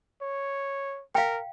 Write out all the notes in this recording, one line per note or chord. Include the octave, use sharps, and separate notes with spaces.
C#5
A#4 F5 G5